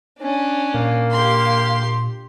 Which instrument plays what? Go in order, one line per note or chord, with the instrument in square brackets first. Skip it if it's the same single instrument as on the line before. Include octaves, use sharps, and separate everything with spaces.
[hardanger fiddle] C#4 D4
[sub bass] A#2 [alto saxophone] A#3
[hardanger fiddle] G4 C6